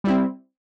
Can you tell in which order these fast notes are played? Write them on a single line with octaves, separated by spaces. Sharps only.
G3 E4 C4